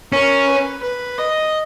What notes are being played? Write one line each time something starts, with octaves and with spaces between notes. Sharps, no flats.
C#4 A#4
B4
B4
D#5